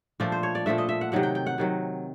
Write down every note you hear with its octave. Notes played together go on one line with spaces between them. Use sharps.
A#2 F3 A3 D4
C5
C#5
D5
A#2 F3 A3 D4 E5
D#5
E5
F#5
C3 D#3 F#3 F#5
G5
G5
F#5
C3 D#3 F#3